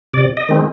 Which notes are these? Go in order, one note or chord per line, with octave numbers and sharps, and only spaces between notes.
C3 D5
D#5
D#3 G#3 C4